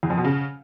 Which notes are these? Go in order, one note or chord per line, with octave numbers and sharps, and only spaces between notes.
E2
F2
B2
C#3